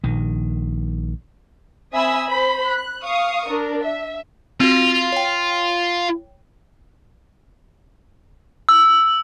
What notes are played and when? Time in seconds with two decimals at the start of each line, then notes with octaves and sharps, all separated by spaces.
0.04 A#1 D#3
1.94 C4 E5 G#5 B5 D#6 E6
2.29 C5 B5
2.66 F#6
3.05 F5 C#6 D#6
3.47 D4 A#4
3.84 E5
4.60 C4 F4 F#4
5.12 C#5 G5
8.69 E6